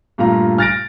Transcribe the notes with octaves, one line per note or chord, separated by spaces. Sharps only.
G2 A#2 A3 F4 A#5
F6 A6 A#6 D7